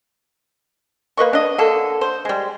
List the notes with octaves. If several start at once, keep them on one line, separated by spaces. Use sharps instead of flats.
A#3 B4 D#5 C#6
D4 D#5
D3 A#3 A4
C5
G3 G#3